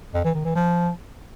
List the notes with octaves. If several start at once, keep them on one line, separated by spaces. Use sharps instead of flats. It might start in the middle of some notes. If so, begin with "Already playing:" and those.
F2
E3
D#3
E3
F3